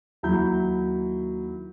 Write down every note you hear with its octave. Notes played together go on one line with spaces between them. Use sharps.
D#2 F#3 E4 A#5 B5 G6